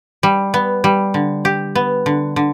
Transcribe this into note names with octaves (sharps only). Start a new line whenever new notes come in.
G3
B3
G3
D3
G4
B3
D3
D3